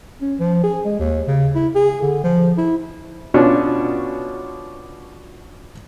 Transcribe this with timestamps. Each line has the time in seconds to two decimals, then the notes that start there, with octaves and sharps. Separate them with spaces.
0.21 C#4
0.40 F3
0.63 G#4
0.85 G#3
0.99 D#2
1.27 C#3
1.55 E4
1.75 G#4
2.02 D3
2.24 F3
2.57 E4
3.34 B2 C#4 D4 F4